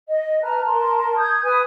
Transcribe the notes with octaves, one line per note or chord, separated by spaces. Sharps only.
D#5
B4 A5 A#5 F6
A#4 A5 C6
D#6 G6 G#6
B4 G#5 D#6